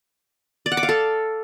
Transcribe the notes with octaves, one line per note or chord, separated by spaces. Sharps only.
D5
F#5
D6
F5
A4